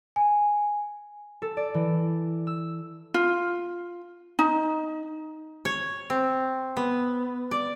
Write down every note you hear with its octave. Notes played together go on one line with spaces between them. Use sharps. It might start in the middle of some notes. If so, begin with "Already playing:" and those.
G#5
A4
D5
E3
E6
F4
D#4
C#5
C4
B3
D5